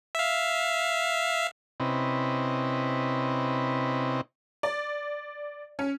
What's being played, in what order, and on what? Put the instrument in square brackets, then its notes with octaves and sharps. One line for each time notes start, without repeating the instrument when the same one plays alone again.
[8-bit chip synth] E5 F5
[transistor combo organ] C3 C4 C#4 E4 B4 D#5
[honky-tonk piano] D5
C#4